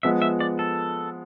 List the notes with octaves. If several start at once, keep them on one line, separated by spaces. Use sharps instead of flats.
F3 G#3 B3 E5
E5
D5
A4